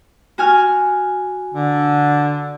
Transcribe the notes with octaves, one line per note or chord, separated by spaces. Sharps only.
F#4 G#5 F6
D3